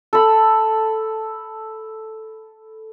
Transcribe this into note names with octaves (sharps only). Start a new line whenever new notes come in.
A4 B5